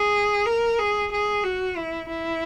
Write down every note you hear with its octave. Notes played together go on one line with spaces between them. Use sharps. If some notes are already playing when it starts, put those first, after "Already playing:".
Already playing: G#4
A#4
G#4
G#4
F#4
E4
E4